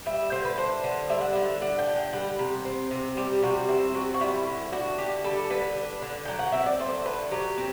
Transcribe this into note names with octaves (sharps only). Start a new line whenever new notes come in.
G3 E5
D3 C5
B4
D4 C5
D3
G3 E5
F#5
D3 E5
D4 F#5
G5
D3
G5
G3 F#5
C3
C4
C3
G3 G4
C3 F#4
C4 E4
C3 F#4
F#4
G3 E4
D3
D4 F#4
D3 G4
G3 A4
D3 B4
D4
D3
F#3 G5
F#5
C4 E5
D5
A3 C5
D3 B4
F#3 G4
C4